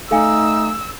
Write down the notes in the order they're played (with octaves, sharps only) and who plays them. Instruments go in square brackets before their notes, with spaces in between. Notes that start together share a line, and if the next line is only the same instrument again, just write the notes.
[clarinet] A3 [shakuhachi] D#4 [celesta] A4 F5 G#5 [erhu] E6